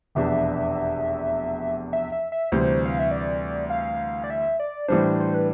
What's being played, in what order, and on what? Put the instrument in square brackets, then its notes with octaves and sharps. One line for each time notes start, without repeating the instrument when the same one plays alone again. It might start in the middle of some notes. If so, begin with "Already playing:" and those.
[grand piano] F1 E2 B2 B3 D4 [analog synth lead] E5
[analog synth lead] E5
E5
E5
[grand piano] D2 C3 E3 G3 [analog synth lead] C5
[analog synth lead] F5
E5
D5
F5
D5
E5
D5
[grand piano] A2 E3 G3 D4 [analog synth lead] C5
[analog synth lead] C5
B4